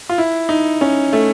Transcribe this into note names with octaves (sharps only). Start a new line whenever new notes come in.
F4
E4
D#4
C#4
A3